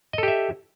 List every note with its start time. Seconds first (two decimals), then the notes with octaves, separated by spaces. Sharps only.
0.13 D#5
0.18 A4
0.23 G4
0.28 E5